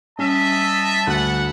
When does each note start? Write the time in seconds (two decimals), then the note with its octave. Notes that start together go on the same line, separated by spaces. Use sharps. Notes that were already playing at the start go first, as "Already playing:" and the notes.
0.19 G3 C#4 D#5 E5 A5
1.07 D2 F#5